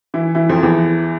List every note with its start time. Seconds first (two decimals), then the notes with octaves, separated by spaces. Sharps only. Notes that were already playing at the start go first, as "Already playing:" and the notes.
0.14 E3 E4
0.35 E3 E4
0.49 F2 F3
0.63 E2 E3